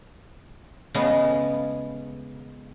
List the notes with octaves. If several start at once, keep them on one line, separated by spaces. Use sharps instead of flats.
C#3 G#3 A3 B3